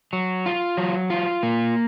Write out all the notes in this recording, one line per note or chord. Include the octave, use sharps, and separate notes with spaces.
F#3
F4
F#3
F4
A#3